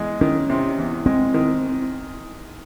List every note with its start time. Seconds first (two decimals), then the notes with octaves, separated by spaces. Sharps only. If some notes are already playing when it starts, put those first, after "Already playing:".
Already playing: E2 G#3
0.21 D#3 C#4
0.50 C3
0.78 E2
1.06 G#3 C4
1.34 D#3